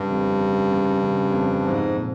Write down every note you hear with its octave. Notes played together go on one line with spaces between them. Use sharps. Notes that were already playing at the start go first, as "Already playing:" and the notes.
Already playing: G2 C#3
F2
C#3
C#3
C#3
F2
G#2 F3
A#2